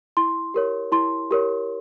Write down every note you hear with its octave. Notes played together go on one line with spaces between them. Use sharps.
E4 C6
G4 A#4 C#5
E4 C6
G4 A#4 C#5